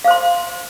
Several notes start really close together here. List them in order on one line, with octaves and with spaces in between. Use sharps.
F5 C5 C6